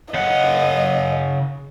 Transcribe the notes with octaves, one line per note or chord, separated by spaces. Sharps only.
C#3 D#5 F#5